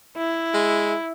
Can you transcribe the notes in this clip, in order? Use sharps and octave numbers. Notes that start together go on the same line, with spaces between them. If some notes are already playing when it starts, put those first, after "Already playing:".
E4
G#3